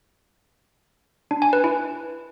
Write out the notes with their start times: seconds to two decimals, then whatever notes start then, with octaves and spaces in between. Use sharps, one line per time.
1.31 D4
1.42 G#5
1.53 B4
1.64 E4